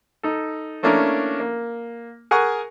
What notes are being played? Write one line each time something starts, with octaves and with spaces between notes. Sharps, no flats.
D#4 A4
A3 A#3 C#4 D4 E4 A#4
A#3
G#4 A#4 F#5 G#5 C#6